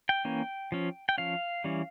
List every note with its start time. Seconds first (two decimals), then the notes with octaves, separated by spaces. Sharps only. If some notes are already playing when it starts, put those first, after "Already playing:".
0.09 G5
0.25 E3 A#3 C#4
0.72 F3 C#4
1.09 G5
1.18 F3 C#4 F5
1.64 E3 G3 C#4